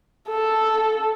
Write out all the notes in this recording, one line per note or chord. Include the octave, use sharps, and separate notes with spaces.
A4